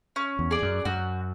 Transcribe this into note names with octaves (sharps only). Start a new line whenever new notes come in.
C#4
E2
G#4 D5
F#2
F#2 F#4